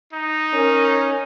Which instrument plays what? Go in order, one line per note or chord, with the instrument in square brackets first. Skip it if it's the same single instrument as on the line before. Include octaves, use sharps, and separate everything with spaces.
[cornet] D#4
[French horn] C#4 [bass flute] A#4